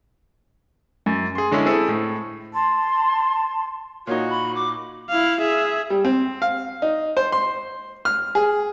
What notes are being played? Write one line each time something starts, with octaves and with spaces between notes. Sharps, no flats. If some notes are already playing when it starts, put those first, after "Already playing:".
F#2
G#4 C6
D3 G#3 C#4 E4 G#4
C4 E4 G#4 A4
A2
A5 C6
A#2 D#4 F#4 C#5
B5
D6
E4 F5
G#4 E5
G3
C4
F5
D#4
C5
C6
F6
G#4